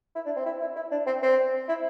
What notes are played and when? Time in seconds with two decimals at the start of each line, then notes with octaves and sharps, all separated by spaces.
0.15 E4
0.26 D4
0.37 C4
0.46 E4
0.61 E4
0.76 E4
0.91 D4
1.07 C4
1.23 C4
1.68 E4